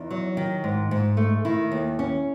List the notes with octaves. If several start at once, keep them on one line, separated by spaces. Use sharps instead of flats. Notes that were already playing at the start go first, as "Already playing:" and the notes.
Already playing: E2 D#4
F#3
D#3
G#2
G#2
A3
D#3 E4
D#2
C#4